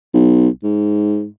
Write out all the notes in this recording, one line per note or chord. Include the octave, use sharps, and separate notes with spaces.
B1
G#2